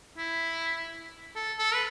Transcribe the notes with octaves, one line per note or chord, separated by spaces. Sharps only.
E4
A4
A4
B4